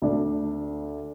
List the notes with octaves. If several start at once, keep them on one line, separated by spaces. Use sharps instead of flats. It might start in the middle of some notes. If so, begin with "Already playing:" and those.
D2 D3 D4